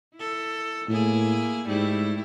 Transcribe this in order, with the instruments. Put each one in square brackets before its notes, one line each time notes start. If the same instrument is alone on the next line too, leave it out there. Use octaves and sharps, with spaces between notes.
[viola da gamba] E4 A4
[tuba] A2 [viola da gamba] A#3 E4 G#4
[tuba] G#2 [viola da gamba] G3 A3 E4